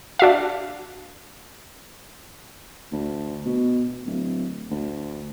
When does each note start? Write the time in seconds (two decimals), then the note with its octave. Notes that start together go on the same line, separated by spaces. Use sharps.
0.19 D4 F#4 E5 F5
2.92 D2
3.45 B2
4.06 D1
4.71 D2